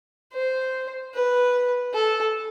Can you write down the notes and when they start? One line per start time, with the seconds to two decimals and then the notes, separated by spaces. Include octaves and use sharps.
0.33 C5
1.14 B4
1.94 A4